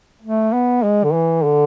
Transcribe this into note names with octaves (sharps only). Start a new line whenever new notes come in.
A3
B3
G#3
D3
E3
D3